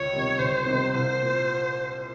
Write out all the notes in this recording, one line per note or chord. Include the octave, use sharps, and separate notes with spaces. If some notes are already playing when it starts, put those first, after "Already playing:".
Already playing: C#2 C#5
C3 D#3 G3
C#2 C5
C3 D#3 G3
C2 C5
A#2